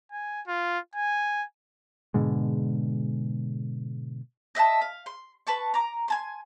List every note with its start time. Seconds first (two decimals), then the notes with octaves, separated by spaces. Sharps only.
0.12 G#5
0.47 F4
0.95 G#5
2.14 G#2 B2 D3 G#3
4.55 D#5 E5 F#5 A5
4.81 F5
5.06 C6
5.47 B4 A5 C#6
5.74 A#5 D6
6.08 G#5 A5 C6